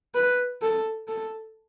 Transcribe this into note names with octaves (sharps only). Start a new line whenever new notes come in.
B4
A4
A4